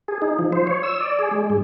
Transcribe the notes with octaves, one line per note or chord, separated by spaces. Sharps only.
G#4
D#4
F3
C5
C#5
E6
D5
G#4
G#3
G2